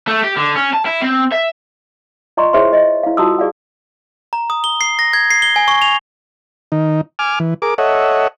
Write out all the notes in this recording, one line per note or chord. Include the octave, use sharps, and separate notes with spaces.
A3
G4
D3
C#4
A5
E4
C4
E5
F4 D5 D#5 A#5 C6 C#6
E4 G#4 C5 C#5 E5 C6
D#5
E4 F5
F4 F#4 A5 A#5 D#6 E6
G#4 D5 F5 F#5
A#5
D#6
G7
C7
A#6
G#6
C7
G7
G#5
C#6
F7
D#3 D#4
G#5 D6 F6
E3
G#4 A#4 D6
A4 C#5 D#5 E5 F#5